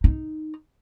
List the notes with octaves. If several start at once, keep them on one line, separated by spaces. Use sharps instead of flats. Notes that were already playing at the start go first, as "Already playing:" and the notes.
D#4